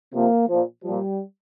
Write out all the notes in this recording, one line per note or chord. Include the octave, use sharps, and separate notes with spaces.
C3 F3 A#3
A#2 F3
A#2 F3 G3